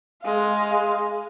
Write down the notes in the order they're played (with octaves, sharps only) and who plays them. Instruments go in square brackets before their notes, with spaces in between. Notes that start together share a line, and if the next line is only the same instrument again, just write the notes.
[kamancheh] G#3 F5